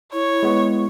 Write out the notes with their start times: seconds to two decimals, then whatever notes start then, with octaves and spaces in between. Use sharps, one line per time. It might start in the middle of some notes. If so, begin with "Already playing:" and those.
0.13 E4 C#5
0.43 G#3 B3